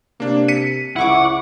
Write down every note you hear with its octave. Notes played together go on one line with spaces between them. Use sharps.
C3 A#3 D4
B6 C#7 D#7
C#2 E4 F#5 C#6 D6